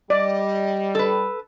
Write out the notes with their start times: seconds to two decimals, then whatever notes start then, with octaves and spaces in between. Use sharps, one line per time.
0.10 G3 D5 D#5
0.95 A4 B4